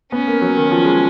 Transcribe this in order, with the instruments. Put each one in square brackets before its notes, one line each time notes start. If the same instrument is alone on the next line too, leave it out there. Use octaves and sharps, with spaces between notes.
[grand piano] B3 [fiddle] C#4
[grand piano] A#3
F#3
D#3
F3
G#3